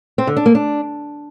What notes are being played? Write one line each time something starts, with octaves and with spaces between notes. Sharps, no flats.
C4
D3
D4
A#3
D4